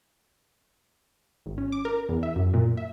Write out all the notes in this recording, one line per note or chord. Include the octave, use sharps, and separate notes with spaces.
G#1
C#4
D6
A#4
E2
E5
F#2
A#2
E5